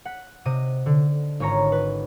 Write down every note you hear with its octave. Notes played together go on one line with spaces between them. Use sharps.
F#5 B6
C3 D#5 D#7
D3
G#1 C#4 F4 C#5 A#5
B4